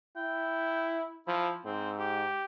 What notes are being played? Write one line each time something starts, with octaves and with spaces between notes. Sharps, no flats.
E4 G5
F3 E4
G#2 C4
G4